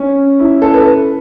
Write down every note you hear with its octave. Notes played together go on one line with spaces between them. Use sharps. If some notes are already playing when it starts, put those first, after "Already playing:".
Already playing: C#4
E4
A4
B4
B4